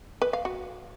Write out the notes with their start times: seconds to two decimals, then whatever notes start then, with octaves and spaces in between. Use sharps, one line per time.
0.22 B4
0.33 F5
0.45 F#4